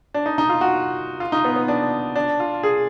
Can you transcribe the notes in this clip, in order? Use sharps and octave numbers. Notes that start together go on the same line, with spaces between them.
D4
D#4
D#4
F4
F#4
F4
D#4
B3
B3
D4
D4
F4
G#4